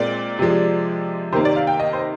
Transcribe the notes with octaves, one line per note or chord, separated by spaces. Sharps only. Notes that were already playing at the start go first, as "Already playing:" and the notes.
Already playing: A#2 G#3 C4 D5
C3 F3 G#3
C3 D#3 A#3 C5
D5
F5
G5
D#5
C5